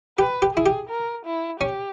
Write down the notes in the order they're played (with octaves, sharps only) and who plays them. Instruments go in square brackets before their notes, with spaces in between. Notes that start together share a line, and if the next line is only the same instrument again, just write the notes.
[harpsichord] G4 [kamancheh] B4
[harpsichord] G4
[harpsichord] E4 [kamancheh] G#4
[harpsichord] G4
[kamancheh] A#4
E4
[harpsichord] C#4 [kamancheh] G4